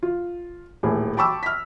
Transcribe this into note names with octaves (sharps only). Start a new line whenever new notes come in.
F4
D#1 A2 G#4
G5 A5 B5 C#6 D6 E6
F6 B6